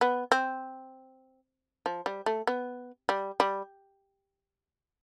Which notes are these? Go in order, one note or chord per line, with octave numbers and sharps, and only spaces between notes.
B3
C4
F3
G3
A3
B3
G3
G3